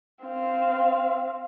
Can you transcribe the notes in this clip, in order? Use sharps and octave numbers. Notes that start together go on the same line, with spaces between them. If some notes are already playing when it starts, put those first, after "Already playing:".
C4 F5